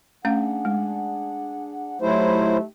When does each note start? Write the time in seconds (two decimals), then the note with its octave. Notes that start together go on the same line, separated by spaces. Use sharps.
0.25 A3 C#4 D4 G#4 F5 F#5
0.65 G#3
2.02 F#3 A3 D#4 E4 G4 C5